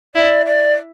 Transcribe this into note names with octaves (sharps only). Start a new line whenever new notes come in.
E4 D5
D5